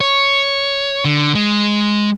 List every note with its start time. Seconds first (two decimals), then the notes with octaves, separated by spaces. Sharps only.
0.01 C#5
1.05 D3
1.35 G#3